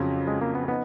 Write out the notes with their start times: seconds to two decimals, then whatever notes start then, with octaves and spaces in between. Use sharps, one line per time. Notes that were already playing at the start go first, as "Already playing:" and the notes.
Already playing: F2 C#3 F#3 C#4 F4
0.27 G#3
0.41 A#3
0.55 B3
0.68 B3 D#4